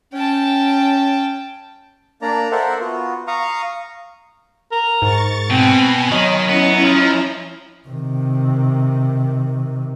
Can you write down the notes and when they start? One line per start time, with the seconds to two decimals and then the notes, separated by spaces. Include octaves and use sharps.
0.13 C#4 G5 A5
2.22 A#3 D4 D5 A#5
2.52 A4 A#4 C5 E5 F#5
2.80 B3 F4 F#4
3.27 F5 A#5 C#6 D#6
4.71 A#4
5.02 G#2 C#6 A6
5.50 B2 C4 G#5 B5
6.12 D#3 F#3 D#5
6.49 B3 C#4 E4 A#5
6.83 F3
7.88 C3 D#3